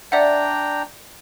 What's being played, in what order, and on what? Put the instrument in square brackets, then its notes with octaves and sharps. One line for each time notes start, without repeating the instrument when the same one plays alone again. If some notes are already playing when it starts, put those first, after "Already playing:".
[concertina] D4 G5 A#5 [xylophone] D5 E5 F#5